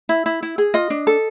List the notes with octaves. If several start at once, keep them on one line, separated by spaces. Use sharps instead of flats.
E4
E4
E4
G#4
F4 D#5
D4
A4